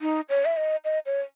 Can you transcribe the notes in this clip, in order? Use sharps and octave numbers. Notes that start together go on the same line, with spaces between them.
D#4
C#5
E5
D#5
D#5
C#5